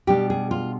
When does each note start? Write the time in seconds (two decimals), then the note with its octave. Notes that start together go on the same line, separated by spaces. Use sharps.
0.07 B2 G3 D4 G4
0.30 G#4
0.51 F4